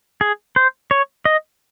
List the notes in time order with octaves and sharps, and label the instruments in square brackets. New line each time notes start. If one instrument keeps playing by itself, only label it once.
[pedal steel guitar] G#4
C5
C#5
D#5